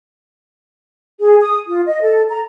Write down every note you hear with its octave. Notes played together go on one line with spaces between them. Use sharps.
G#4
D#6
F4
D#5
A4
A#5